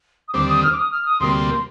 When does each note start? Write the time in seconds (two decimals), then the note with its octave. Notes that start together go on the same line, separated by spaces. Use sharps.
0.28 D#6
0.34 D#2 D3 G3 C4 D6
0.49 D#6
0.63 F6
0.72 D6
0.78 D#6
0.91 F6
1.05 D#6
1.20 D2 C3 G3 A#3 C6